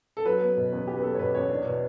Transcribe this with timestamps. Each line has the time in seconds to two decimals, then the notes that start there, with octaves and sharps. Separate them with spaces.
0.17 A4
0.25 F#3 B4
0.41 B3
0.57 B2
0.72 E2
0.88 F#3 G4
0.98 B4
1.03 B3 A4
1.15 C#5
1.19 B2 B4
1.34 E2 C#5
1.50 D4
1.66 B2